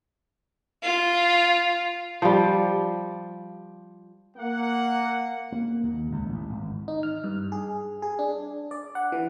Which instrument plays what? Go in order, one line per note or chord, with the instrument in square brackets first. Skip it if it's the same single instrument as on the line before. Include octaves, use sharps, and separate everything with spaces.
[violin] F4
[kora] F3 G3
[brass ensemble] A#3 F#5
[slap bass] A#3
D#2
C#2
A1
G#1
[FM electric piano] D#4
F6
G2
G#4
G#4
D4
D5
F#5
E3